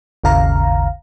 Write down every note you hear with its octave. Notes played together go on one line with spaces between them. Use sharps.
G#1 D#2 C#3 F5 A#5